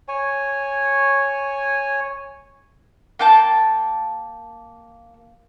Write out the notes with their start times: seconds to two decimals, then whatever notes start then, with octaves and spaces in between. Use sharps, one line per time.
0.08 C#5 G#5
3.19 A#3 G5 A5